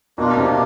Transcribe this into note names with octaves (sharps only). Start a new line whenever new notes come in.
B2 A#3 D4 F4
C3